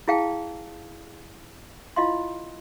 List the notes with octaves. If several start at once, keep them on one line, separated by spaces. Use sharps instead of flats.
E4 G#4 F5 G5 A5
E4 F4 D#5 F5 C6